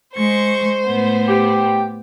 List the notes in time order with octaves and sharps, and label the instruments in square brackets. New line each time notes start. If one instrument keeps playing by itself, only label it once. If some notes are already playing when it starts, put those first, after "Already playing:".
[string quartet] G#3 C#6 [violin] C5
[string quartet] A2 B3
[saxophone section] G4